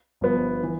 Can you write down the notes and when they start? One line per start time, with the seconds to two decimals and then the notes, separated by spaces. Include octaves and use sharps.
0.21 G1 G2 F3 B3
0.63 E3